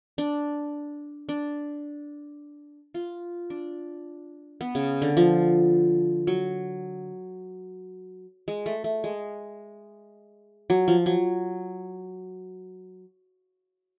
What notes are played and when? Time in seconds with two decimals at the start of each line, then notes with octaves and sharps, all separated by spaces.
0.18 D4
1.29 D4
2.94 F4
3.50 D4
4.61 B3
4.75 C#3
5.02 D3
5.17 F3
6.27 F#3
8.48 G#3
8.66 A3
8.84 A3
9.04 G#3
10.70 F#3
10.88 F3
11.06 F#3